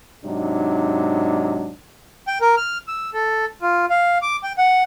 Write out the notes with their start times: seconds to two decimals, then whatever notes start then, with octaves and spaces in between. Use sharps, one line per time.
0.25 G#2 C3 F#3 D4 D#4
2.28 G5
2.41 A#4
2.57 F6
2.88 E6
3.14 A4
3.62 F4
3.90 F5
4.22 D6
4.44 G5
4.58 F#5